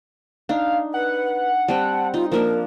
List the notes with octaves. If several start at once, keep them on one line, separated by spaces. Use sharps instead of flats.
D4 D#4 F5
B4 F#5
G3 C4 G5 A5
D#4 F4
F3 A#3 D4 A#4